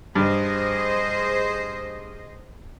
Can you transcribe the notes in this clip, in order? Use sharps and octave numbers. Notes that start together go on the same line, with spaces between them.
G2 G#4 C5 D#5